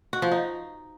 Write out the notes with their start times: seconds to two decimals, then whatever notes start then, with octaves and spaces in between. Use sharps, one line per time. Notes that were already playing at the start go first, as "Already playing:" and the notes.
0.13 F#4
0.22 F3
0.31 D#4